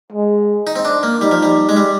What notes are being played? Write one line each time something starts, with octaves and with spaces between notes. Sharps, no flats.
G#3
D#4
C4
D4
A#3
G3 D#4
F3
G3
G#3
G3